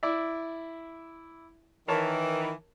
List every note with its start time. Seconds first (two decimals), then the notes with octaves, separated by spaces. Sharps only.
0.03 E4 D5 E5
1.88 D#3 E3 A#4 C#5 A5